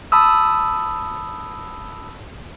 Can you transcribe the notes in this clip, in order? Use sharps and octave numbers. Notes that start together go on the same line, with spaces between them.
A5 B5 D#6 E6